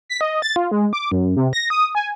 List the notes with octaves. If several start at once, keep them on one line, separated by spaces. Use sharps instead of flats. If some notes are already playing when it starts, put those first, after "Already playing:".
B6
D#5
A6
F4
G#3
D6
F#2
C3
A#6
D#6
G#5